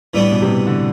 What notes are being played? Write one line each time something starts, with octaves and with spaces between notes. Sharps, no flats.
A2 E3 G3 B3 D4
B2
C3
B2
D3